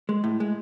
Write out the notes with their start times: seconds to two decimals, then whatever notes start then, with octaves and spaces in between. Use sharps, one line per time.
0.09 G#3
0.24 A2
0.40 G#3